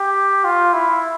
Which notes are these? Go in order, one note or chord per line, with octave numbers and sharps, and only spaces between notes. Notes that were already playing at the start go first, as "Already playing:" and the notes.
Already playing: G4
F4
E4